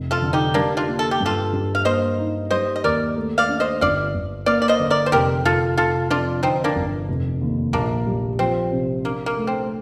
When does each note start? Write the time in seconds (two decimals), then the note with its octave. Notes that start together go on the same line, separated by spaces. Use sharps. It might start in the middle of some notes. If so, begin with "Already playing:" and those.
Already playing: F1
0.11 F4 A4
0.22 D3
0.33 D#4 G4
0.54 G3 A#3 D4
0.77 D4 F4
0.88 A#3
0.99 A4
1.11 G4
1.20 G2
1.26 F4 A4
1.53 G2
1.75 F5
1.85 A#3 C5 D#5
2.18 D#4
2.51 G3 C5 D#5
2.76 D#5
2.84 D#2 A#4 D5
3.16 A3
3.38 D5 F5
3.49 D4
3.60 C5 D#5
3.81 G1 D5 F5
4.15 G1
4.46 A#3 D5 F5
4.62 D5
4.68 C5 D#5
4.80 D3
4.90 A#4 D5
5.06 C5
5.12 F1 G4 A#4
5.45 F1 F4 A4
5.78 F1 F4 A4
6.10 F2 D4 F4
6.43 D3 C4 D#4
6.64 A#3 D4
6.76 G1
7.08 F1
7.41 D#2
7.73 A#1 A#3 D4
8.07 G3
8.39 F3 C4
8.72 C3
9.04 A#3 D4
9.26 A#3
9.37 A3
9.47 C4